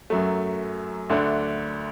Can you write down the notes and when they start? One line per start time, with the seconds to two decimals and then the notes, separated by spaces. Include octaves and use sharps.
0.10 F#2 F#3 A3
1.10 D2 D3 A3 D4